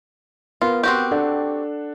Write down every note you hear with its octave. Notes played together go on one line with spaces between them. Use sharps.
B3 F4 A#4
C4 F#4 G4
D4 A4 F#5